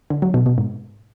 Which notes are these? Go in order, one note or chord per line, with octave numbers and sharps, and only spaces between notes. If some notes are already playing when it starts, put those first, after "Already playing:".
D3
F#3
B2
B2
G#2